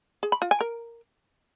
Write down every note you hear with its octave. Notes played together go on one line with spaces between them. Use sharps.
G#4
B5
F4
G#5
A#4